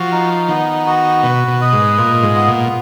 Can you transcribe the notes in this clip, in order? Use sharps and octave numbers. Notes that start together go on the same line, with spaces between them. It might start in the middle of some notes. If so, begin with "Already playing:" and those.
Already playing: F3 F#4
D#4
D#3 B3
F#4
B2 B4
B2
D#5
G#2
A#2 F4
G#2
B3
A#2